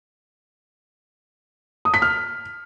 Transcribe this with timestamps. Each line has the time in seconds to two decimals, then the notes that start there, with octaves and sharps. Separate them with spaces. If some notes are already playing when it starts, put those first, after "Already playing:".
1.85 D#6
1.94 B6
2.02 F6